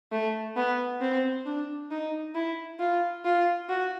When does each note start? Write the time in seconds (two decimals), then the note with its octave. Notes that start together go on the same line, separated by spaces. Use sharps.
0.12 A3
0.56 B3
1.01 C4
1.46 D4
1.91 D#4
2.35 E4
2.79 F4
3.25 F4
3.69 F#4